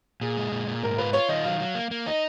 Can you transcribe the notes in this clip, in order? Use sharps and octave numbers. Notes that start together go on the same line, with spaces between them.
A#2 G#4
G#3
A#2
A#2
G#2 A#4
F4 B4
F4 C#5
D#3 D#5
F#3 F5
F#3
A#3
A#3
D#4 D#5